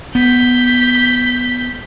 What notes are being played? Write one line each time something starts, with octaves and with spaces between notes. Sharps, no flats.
B3 G6 B6